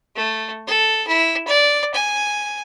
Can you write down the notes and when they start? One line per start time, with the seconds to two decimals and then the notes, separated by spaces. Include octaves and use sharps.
0.16 A3
0.67 A4
1.07 E4
1.47 D5
1.94 G#5